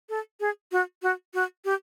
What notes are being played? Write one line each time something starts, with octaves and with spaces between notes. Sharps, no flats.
A4
G#4
F#4
F#4
F#4
G4